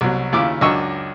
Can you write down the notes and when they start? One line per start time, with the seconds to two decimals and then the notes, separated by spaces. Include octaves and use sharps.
0.01 C2 B2 F#3
0.32 D#2 C#3 E4 F4 D6
0.61 C#2 F#2 D4 D#5 C#6 E6